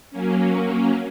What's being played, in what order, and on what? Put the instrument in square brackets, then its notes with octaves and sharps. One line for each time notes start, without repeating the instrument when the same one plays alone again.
[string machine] F#3 A#3 C#4